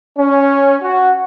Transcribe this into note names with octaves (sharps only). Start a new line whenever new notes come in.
C#4
F#4